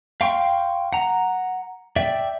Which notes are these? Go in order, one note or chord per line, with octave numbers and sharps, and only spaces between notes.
F5 G5 C6 C#6
F#5 A#5
D5 E5 G5